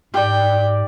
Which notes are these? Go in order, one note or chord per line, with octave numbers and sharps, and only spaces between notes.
G#2 G4 D5 G5